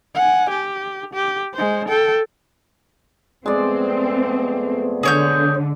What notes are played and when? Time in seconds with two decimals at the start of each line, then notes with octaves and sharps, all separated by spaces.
0.15 F#5 G#5
0.50 G4
1.13 G4
1.54 G#3 C5
1.88 A4 G5
3.46 F2 G#3 A3 B3 C4 D5
5.03 D3 G#4 C#5 G6